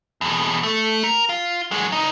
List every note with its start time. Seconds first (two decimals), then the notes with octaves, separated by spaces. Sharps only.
0.21 E2 B2
0.63 A3
1.04 A#4
1.29 F4
1.71 F#3 G#3
1.92 C#2 D#4